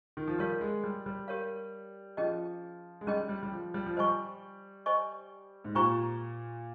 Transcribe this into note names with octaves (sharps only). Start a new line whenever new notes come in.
D#3
F3
G3 G4 A#4 C#5 F5
G#3
G3
G3
G4 A#4 C#5 F5
F3 C#4 G#4 D#5 G5
G#3
G3 C#4 G#4 D#5 G5
G3
G3
F3
G3
F3
G3 C5 D#5 G#5 C#6
C5 D#5 G#5 C#6
G#2
A#2 G4 C5 G5 A#5 C#6